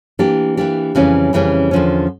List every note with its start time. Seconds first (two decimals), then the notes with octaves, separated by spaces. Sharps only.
0.19 E3 A#3 D4 G4
0.57 E3 A#3 D4 G4
0.95 F2 C#3 E3 G3 C#4
1.33 F2 C#3 E3 G3 C#4
1.71 E2 D3 F3 C#4